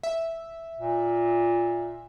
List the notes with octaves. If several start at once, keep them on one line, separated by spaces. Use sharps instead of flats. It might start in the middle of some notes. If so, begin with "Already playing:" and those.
E5
A#2